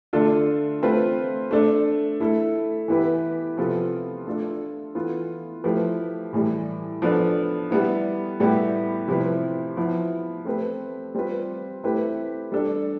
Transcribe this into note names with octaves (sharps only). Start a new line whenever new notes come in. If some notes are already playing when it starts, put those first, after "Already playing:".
D3 A3 D4 F4 A4
A3 C4 F4 B4
A3 D4 A4
A3 E4 A4
E3 B3 E4 G4 B4
C3 F3 B3 F4 A4
A3 D4 F4 A4
E3 B3 F4 A4
F3 A3 E4 G4 B4
A2 E3 G3
F3 B3 D4 A4
G3 B3 E4
A2 G3 B3 E4 G4
C3 F3 C4 E4 B4
F3 B3 E4
A3 C4 G4 B4
G3 C4 F4 B4
A3 C4 E4 G4 B4
G3 D4 A4